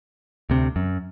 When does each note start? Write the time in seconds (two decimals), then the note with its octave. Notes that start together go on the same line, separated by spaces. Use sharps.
0.50 D2 C3
0.76 F#2